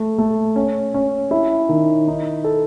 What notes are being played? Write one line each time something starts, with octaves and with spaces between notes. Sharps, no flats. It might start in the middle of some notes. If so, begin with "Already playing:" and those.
Already playing: A3
A3
C#4
C#4
E4
D#3
D#4
A4